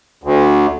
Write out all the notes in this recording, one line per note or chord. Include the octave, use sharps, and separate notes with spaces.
D2